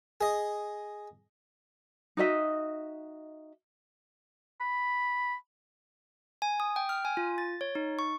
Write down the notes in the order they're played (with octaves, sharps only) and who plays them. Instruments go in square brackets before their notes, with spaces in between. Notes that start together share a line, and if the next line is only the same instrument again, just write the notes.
[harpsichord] G#4 D#5
[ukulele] D#4 F#4 D#5 E5
[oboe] B5
[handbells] G#5
D#6
G5
F6
G#5
F4
A6
C#5
D#4
C#6